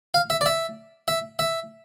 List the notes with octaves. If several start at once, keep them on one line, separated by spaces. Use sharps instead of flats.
F5
E5
D5
E5
E5
E5